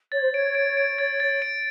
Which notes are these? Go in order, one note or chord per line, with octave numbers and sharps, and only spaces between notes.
C#5 A6
C5
C#5 D7
D7
D7
A6
A6
D7